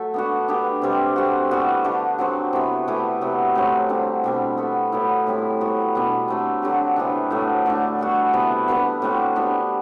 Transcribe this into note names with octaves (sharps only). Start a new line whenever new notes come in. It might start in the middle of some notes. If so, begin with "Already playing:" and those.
Already playing: F#3 A3 A4 E5
B3 D4 F#4
B3 D4 G4
C3 G3 C4
A3 C4 F#4
E3 G3 B3 F#4
D3 A3 D4 G4
F#3 C4 F#4 C5
C3 E3 B3
E3 A3 E4 G4
C3 F#3 B3
A2 F#3 C4 F#4
D3 G3 C4
B2 G3 C4
B3 F#4 A4 E5
A2 F#3 B3 E4
A2 G3 C4 E4
F#3 B3 F#4
B2 G3 B3 D4
F#3 A3 C4
D3 F#3 C4 G4
C3 E3 B3 D4
A2 F#3 A3
D3 A3 D4
G3 B3 F#4
C3 E3 B3
B3 D4 G4 B4
A2 G3 C4 F#4
B3 D4 G4